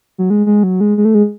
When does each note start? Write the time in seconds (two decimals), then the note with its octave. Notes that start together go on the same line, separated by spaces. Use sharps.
0.18 F#3
0.30 G#3
0.46 G#3
0.63 F#3
0.81 G#3
0.98 G#3
1.05 A3
1.15 G#3